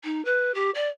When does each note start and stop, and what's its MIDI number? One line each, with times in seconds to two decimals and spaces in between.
0.04 0.23 63
0.25 0.51 71
0.54 0.70 67
0.74 0.88 74